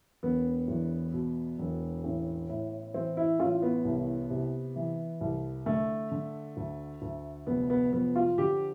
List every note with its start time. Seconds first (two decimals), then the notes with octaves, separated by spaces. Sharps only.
0.23 E1 B3
0.68 E2
1.14 B2
1.59 E1
2.04 A1
2.49 A2
2.94 E3 C4
3.17 E4
3.40 A1 F4
3.62 B3
3.85 C2
4.30 C3
4.76 E3
5.21 C2
5.66 D3 A3
6.11 D3
6.57 D2
7.02 D2
7.47 F1 B3
7.70 B3
7.92 F2 B3
8.16 F4
8.38 D3 G4